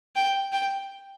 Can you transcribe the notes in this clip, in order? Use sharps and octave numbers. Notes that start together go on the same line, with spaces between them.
G5
G5